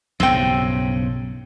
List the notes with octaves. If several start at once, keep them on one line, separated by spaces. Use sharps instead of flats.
B1 G2 C#3 C4 G5